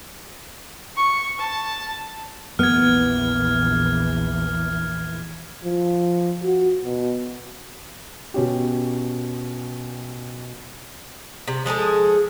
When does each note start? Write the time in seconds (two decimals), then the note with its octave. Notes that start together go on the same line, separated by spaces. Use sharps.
0.97 C#6
1.39 A5
2.59 A#1 E2 E3 B3 F6 G#6
5.65 F3
6.44 F#4
6.84 B2
8.34 B2 C#4 G4
11.48 C3
11.66 F3 G#3 G#4 A4